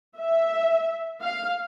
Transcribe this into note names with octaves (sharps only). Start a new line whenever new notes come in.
E5
F5